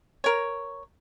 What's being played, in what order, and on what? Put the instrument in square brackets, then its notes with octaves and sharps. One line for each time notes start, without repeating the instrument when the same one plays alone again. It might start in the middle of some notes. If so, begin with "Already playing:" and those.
[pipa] A#4 C#5